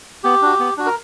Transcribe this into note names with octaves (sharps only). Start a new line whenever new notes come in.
B3 G4
D4 F#4
B3
D4 F#4
A#4